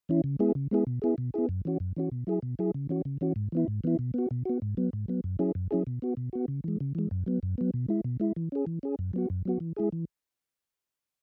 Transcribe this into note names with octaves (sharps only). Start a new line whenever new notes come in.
E3 C#4 E4
C#3
G#3 B3 E4 G#4
C#3
G#3 B3 E4 G#4
B2
B3 E4 G#4
B2
B3 E4 G#4
F#2
E3 C#4 F#4
F#2
E3 C#4 F#4
B2
F#3 E4 G#4
B2
F#3 E4 G#4
C#3
E3 C#4 F#4
C#3
E3 C#4 F#4
G#2
E3 B3 E4
G#2
E3 B3 E4
B2
B3 F#4
B2
B3 F#4
G#2
F#3 B3
G#2
F#3 B3
F#2
F#3 C#4 E4 G#4
F#2
F#3 C#4 E4 G#4
B2
B3 F#4
B2
B3 F#4
C#3
E3 G#3
C#3
E3 G#3
F#2
F#3 B3
F#2
F#3 B3
B2
G#3 E4
B2
G#3 E4
E3
C#4 G#4
E3
C#4 G#4
F#2
F#3 B3 F#4
F#2
F#3 B3 F#4
E3
G#3 E4 G#4
E3